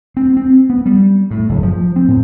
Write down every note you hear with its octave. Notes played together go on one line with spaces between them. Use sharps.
C4
C4
B3
G3
A2
F#1
F3
C4
A2